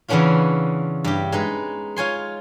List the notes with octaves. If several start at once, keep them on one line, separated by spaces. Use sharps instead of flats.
C#3 E3 B3 C#4 D4 F4
G2 G4
G#3 D#4 B4
F4 C#5 G#5 C6